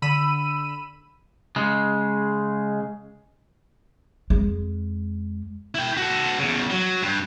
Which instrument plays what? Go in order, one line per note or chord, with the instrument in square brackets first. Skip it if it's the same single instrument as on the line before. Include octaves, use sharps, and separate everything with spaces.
[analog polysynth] D3 B5 E6 D#7
[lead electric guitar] C#3 G#3
[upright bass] F2 G#3
[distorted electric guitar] E4 G5
F#4 A4
E2 C#3
F#3
G2